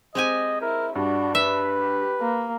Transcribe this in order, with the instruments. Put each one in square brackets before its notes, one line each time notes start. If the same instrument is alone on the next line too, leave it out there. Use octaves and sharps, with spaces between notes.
[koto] G#3 G4 G#5 [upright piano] C4 [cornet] D#5
[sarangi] E4 [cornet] A#4
[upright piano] G2 [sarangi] D4 [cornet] F#4
[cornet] B4 [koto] E5
[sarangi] G4
A#3